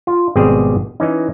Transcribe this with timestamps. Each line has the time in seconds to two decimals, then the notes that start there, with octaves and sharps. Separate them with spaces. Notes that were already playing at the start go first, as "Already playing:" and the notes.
0.07 F4
0.36 G#1 B2 G3 C4 G4 G#4
1.00 E3 C#4 D#4